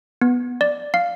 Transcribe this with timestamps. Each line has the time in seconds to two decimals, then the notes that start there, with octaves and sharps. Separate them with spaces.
0.21 B3
0.61 D5
0.94 F5